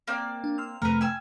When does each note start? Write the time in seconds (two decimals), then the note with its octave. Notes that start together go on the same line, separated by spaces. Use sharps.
0.07 A#3 C4 D5
0.44 D4
0.58 C6 E6 F6
0.82 F2 C3 A3 A#4 B4
1.01 G#5 E6